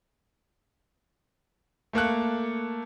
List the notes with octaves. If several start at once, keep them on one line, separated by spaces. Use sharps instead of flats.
A3 A#3 A4 F#6